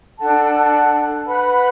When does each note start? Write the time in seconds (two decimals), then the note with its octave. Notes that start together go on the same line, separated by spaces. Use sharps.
0.19 D4 A4 F#5 A5
1.26 B4 F#5 B5